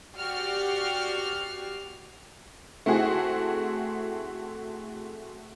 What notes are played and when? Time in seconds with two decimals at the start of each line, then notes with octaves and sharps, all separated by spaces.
0.16 F#4 G4 D5 F6 C7
2.86 A3 C4 E4 F#4 G#4